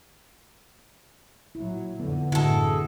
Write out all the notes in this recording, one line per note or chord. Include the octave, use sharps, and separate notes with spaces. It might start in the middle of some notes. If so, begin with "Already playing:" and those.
A#2 F#3 E4
F2 D3 B3
A1 F#2 A2 D3 G#3 E4 F#4 A4